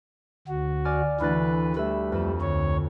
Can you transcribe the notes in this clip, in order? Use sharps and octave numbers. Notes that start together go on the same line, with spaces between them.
D2 F#4
D5 G#5 F6
D2 E3 B4 F#6 A6
G3 A3 B4 E5
F2 B4 E7
D2 C#5